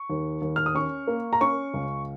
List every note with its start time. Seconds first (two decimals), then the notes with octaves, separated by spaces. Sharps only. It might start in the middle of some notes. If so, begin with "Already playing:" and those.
Already playing: C#6
0.10 D#2
0.42 D#2
0.56 F6
0.66 D#6
0.75 C#4 C#6
1.07 A#3
1.33 A#5
1.41 C#4 C#6
1.74 C#2